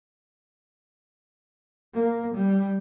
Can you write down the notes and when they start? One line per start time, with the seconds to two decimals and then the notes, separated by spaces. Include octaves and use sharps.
1.94 A#3
2.36 G3